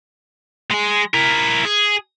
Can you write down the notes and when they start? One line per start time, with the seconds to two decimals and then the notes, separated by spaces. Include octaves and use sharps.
0.70 G#3 G#4
1.14 E4 A#4
1.65 G#4